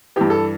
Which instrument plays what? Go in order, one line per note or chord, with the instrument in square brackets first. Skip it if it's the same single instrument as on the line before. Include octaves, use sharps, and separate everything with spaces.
[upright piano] G2 E3 G4
A4